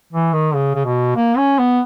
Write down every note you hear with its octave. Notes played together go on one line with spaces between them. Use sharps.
E3
D#3
C#3
C#3
B2
A#3
C#4
B3